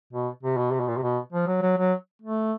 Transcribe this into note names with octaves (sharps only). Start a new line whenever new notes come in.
B2
C3
B2
C3
B2
A#2
C3
B2
F3
F#3
F#3
F#3
A3